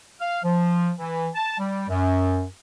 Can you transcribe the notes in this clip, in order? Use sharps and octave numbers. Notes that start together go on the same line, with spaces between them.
F5
F3
E3
A5
G3
F#2